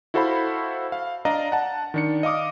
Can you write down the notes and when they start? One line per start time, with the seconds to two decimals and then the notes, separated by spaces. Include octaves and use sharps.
0.14 E4 F#4 A4 C5 F5 B5
0.92 F5
1.25 D4 D5 D#5 F5 A#5
1.52 F#5 A5
1.94 D#3 D4 C#7
2.23 D#5 F5 D6 D#6